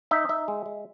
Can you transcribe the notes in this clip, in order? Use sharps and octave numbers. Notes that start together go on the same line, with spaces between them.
D#4 E5
D#4 E5
G#3
G#3